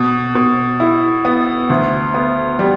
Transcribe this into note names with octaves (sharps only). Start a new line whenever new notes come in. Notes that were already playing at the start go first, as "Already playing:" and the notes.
Already playing: B2
B2
E4
B3
D2
B3
G3